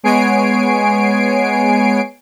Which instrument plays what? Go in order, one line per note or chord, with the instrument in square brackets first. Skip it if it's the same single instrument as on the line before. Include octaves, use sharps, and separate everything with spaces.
[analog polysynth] G#3 B3 C#5 G#5 C7 D7